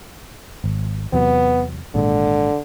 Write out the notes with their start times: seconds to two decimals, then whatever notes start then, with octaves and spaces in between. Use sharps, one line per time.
0.64 G#1
1.13 E2 C3 F#3 B3
1.95 G#1 A#2 D3 G#3